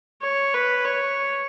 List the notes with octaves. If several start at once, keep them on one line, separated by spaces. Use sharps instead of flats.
C#5
B4
C#5